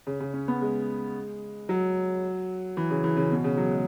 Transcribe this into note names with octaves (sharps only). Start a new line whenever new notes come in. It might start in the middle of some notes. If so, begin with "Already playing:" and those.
C#3
C#3
C#4
B3
G#3
F#3
E3
C#3
E3
C#3
B2
C#3
F#3
G#3